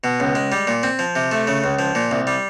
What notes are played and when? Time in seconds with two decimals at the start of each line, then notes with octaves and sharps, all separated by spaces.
0.04 B2
0.20 C#2
0.35 G#3
0.52 G3
0.67 A#2
0.83 C4
0.99 F3
1.15 C3
1.31 A3
1.47 C#3
1.64 C#2
1.79 F3
1.95 A#2
2.11 C2
2.27 G3